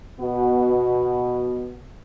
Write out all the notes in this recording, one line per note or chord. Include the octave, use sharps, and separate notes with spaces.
B2 B3 F#4